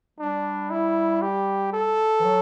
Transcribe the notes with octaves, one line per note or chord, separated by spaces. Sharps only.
G3 D4
E4
G4
A4
E3
F#3